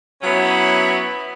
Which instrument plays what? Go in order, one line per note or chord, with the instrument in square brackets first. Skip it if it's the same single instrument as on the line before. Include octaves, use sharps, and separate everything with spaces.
[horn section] F#3 B3 C#4 E4